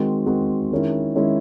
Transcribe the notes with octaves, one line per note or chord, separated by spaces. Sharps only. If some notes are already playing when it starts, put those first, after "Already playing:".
Already playing: D#3 G#3 C4 F#4
D#3 G#3 C4 F#4
D#3 G#3 C#4 E4
D#3 G#3 C#4 E4